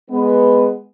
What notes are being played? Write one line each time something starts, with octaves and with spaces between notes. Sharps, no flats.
G#3 B3